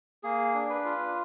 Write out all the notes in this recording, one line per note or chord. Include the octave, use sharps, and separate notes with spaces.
A#3 G#4
D4
B4
F4